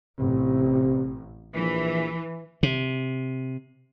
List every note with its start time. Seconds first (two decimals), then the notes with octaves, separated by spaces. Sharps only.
0.19 A1 C3
1.55 A#1 E3
2.63 C3